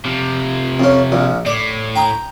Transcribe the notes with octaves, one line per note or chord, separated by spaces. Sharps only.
C3 F3
F2 C#4
A#1 A#2
A2 D5
G5 A#5 D#6